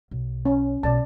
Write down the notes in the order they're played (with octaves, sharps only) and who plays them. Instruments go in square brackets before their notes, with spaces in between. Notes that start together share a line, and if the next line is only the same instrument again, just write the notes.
[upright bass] B1
[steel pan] C#4
[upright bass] B1 B2 [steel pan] D5 A5